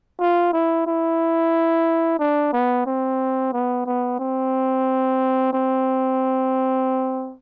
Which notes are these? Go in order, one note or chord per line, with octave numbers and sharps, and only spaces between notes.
F4
E4
E4
D4
B3
C4
B3
B3
C4
C4